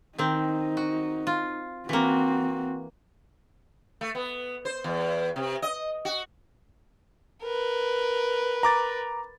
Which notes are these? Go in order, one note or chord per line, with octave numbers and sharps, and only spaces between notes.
D#3 C4 D#4
F#4
F4
E3 A#3 C4 F#4
A3
B3
C5
E2
C3
D#5
F#4
A#4 B4
A#5 D6 A6